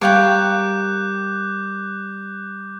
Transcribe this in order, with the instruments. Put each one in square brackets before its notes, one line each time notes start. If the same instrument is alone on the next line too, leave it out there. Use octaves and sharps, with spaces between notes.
[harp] G3 C#5 [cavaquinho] A#4 F5 G5 [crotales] D6 F#6 G6